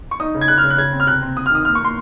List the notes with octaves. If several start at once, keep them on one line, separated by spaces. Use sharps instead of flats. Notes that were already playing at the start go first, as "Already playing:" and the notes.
C#6
D#4 D#6
C#3
G#6
C#3 F#6
F6
C#3
F#6
C#3 G#6
C4
F6
C3 F#6
C4
C4 D#6
F6
D#3 D#6
A#3 F6
C#6
A#3 C6